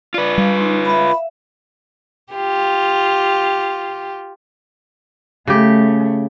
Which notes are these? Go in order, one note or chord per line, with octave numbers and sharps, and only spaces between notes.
F4 B4 D5
G3 F5
D#4 C6
E5 F5 B5
F4 G4
C#3 A3 G4